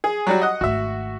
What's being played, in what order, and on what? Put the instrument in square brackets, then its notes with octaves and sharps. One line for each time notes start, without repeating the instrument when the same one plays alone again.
[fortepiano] G#4
F#3 G3 F#4
D#5 F#5 D#6
[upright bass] G#1 A3 [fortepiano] F#4 E5